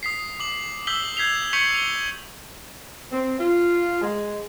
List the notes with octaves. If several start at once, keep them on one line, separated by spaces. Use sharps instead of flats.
D#6 B6 C7
D6 F#7
D6 E6 G6 B6 F#7 G7
G6 G#6 B6 C7 F7 G7
C#6 G6 B6 C#7 F7 F#7
F7 G7
C4
F4
G#3